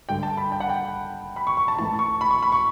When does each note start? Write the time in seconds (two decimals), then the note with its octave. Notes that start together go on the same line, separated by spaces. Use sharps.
0.09 G2 D3 G5
0.23 A5
0.37 B5
0.52 G5
0.60 F#5
0.69 G5
1.36 B5
1.47 C#6
1.57 C#6
1.68 A5
1.79 A2 E3 A5
1.99 C#6
2.21 B5
2.31 C#6
2.42 B5
2.52 C#6